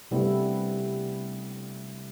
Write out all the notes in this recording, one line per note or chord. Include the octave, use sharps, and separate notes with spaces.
C3 G3 A3 B3 E4